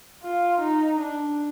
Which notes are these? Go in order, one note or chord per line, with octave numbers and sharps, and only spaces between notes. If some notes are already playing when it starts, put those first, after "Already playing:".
F4
D#4
D4